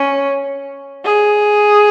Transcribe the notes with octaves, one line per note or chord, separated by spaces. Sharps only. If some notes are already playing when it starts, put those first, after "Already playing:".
Already playing: C#4
G#4